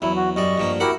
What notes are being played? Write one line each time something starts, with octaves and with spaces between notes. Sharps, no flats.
E2 F#3 E4
F#4
F#2 G3 D5 D#5 C#6
G2 F3 A#3
E4 F#4 G4 A#4 E5 F#5